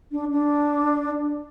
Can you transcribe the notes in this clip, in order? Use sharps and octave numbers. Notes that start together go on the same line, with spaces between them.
D4
D4